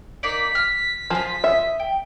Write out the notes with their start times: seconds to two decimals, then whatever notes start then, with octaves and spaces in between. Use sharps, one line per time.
0.23 A#3 D#4 D5 B6
0.55 F6
1.10 F3 F4 G#4
1.44 D#5 E5
1.80 G5